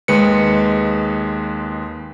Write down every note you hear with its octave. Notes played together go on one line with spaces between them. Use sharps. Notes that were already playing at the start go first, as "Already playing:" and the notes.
D#2 G#3 B4 C#7